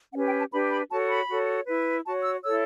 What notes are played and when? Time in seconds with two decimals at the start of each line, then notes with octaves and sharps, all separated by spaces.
0.12 C#4 G4 B4 F#5
0.26 G5
0.38 A5
0.51 D4 G4 B4 B5
0.71 B5
0.90 F#4 A4 C#5 A5
1.09 B5
1.28 F#4 A4 C#5
1.66 E4 B4
2.05 F#4 A5
2.09 C#5
2.24 E6
2.43 E4 A4 C#5 E6